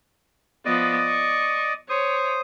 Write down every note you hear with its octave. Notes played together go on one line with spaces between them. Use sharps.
F3 B3 D5 D#5
C#6
C5 C#5 D#6